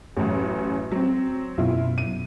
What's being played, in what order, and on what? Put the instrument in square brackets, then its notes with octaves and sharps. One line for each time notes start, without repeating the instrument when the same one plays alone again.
[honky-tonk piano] A1 F#2
F#3 C4
[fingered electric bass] F#2 B2 [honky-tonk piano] E4 F4
[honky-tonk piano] D#7